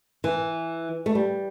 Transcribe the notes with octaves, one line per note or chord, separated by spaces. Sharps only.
E3
A3
G3